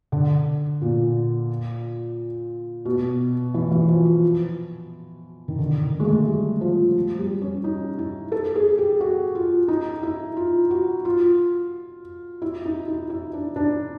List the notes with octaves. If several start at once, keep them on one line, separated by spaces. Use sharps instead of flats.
D3
A#2
B2
E3
E3
F3
F3
D#3
D3
D#3
G#3
A3
G3
F3
G3
C#4
D#4
E4
A4
G#4
G4
F#4
F4
D#4
E4
F4
F#4
F4
E4
D#4
D#4
E4
D4
D4